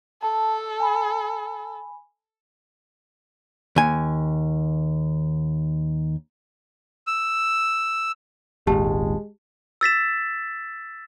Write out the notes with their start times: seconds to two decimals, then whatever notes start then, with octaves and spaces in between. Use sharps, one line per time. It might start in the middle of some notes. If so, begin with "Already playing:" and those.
0.23 A4 A5
0.80 G#5 B5
3.76 D#2 G#5
7.07 E6
8.67 D#1 G#1 G#3 G4 A5
9.81 E6 A6 B6 E7